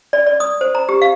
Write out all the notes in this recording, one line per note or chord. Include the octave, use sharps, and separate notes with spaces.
D5
D5
D#6
C5
A#5
G4
F5